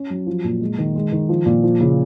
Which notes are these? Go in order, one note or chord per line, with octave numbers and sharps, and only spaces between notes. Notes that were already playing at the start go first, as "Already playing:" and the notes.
Already playing: C#4
F#3
F3
A#2
G#3
D#3
G#3
D#3
F3
A#2
F3
C#3